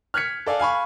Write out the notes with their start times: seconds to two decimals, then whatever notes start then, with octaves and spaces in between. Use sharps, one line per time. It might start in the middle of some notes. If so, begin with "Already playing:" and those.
0.14 F6 F#6 G#6 B6 C#7
0.46 A4 D5 F5 G#5
0.59 F5 G#5 B5 C#6